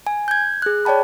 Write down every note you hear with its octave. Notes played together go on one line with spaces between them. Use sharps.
G#5
G6 G#6
G#4 F#6
C#5 D5 G5 A5 B5